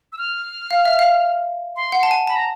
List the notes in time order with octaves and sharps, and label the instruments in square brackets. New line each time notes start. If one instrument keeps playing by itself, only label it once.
[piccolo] E6
F6
[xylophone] F5
E5
F5
[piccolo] C6
[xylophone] F#5
A5
G#5
[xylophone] A5 [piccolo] B5
[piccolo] A#5